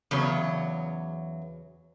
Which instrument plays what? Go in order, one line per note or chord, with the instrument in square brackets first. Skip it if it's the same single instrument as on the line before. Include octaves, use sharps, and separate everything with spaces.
[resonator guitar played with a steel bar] E2 C#3 F#3 C#5